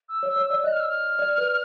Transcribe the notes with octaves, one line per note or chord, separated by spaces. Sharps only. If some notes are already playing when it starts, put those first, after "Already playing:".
E6
C#5
E6
C#5
D5 E6
D#5 F#6
F6
E6
F6
D5
B4